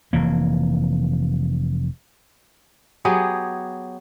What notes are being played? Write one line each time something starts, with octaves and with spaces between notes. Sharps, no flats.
F1 E3 A#3
F#3 B3 G4 G#4